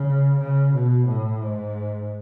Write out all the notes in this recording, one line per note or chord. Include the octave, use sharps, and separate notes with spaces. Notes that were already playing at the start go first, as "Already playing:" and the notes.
Already playing: C#3
C#3
B2
A2
G#2